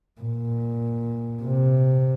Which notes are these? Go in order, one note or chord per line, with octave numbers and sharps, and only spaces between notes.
A#2
C3